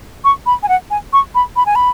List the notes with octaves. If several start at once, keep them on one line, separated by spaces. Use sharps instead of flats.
C#6
B5
G#5
F#5
G#5
C#6
B5
B5
G#5
B5